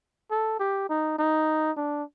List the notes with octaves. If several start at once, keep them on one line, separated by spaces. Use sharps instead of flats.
A4
G4
D#4
D#4
D4